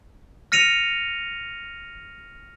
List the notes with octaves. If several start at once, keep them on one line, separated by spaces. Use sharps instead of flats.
F6 A#6 C#7 D#7 F7